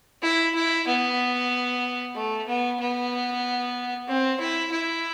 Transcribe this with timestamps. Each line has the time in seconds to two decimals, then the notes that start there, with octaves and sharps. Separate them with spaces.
0.22 E4
0.54 E4
0.87 B3
2.15 A3
2.48 B3
2.79 B3
4.08 C4
4.40 E4
4.72 E4